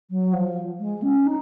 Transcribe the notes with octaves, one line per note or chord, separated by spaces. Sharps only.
F#3
F3
G#3
C#4
D#4